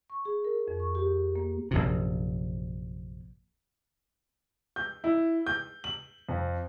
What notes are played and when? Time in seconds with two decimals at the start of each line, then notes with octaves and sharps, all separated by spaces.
0.10 C#6
0.25 G#4
0.45 A#4
0.68 F2
0.80 C#6
0.95 G4
1.36 A#3
1.71 A#1 F#2 C3
4.76 G6
5.04 E4
5.46 G6
5.84 F#7
6.29 F2